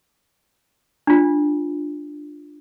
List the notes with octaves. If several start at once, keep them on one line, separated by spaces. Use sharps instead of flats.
D4 F4